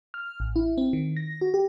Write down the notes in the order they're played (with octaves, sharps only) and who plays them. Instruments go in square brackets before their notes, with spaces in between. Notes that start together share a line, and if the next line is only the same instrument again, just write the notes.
[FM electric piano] F6
A1
E4
C4
D#3
A#6
F#4
G4